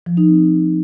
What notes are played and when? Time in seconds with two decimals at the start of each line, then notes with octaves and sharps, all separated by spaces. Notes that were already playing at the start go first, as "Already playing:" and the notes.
0.06 F3
0.17 D#4
0.28 C4